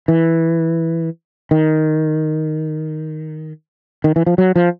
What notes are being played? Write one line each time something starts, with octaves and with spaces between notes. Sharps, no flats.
E3
D#3
D#3
E3
F3
F#3
F3